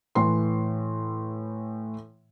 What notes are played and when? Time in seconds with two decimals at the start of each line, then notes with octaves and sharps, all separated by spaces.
0.15 A2 E3 C6